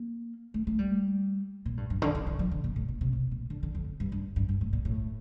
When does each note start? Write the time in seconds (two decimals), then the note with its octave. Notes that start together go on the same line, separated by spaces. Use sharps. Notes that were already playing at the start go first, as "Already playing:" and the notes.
Already playing: A#3
0.54 A3
0.67 A3
0.79 G3
1.66 A#2
1.77 G2
1.90 G2
2.02 D3
2.15 D#3
2.26 D3
2.39 F3
2.51 D3
2.64 A#2
2.76 A2
2.88 A#2
3.01 C3
3.13 C3
3.31 A#2
3.50 D3
3.63 D3
3.75 F2
4.00 G2
4.12 G2
4.36 G2
4.49 G2
4.61 A2
4.73 A#2
4.85 A2